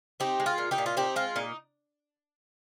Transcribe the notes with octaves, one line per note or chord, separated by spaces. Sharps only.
C4 D#4 G4
G#3
F4
A#2
D#4 G4
A#2
F4
C4 D#4 G4
G#3 F4
A#2 D#4